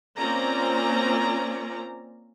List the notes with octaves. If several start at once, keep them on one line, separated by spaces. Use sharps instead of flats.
A#3 C4 C#4 F4 D5 A#5